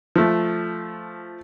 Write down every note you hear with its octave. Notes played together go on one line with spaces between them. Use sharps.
F3 A3